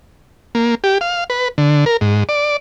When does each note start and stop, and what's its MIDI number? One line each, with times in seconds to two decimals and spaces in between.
0.55 0.75 58
0.84 0.98 67
1.01 1.24 77
1.30 1.48 71
1.58 1.85 50
1.86 1.97 70
2.01 2.24 44
2.29 2.57 74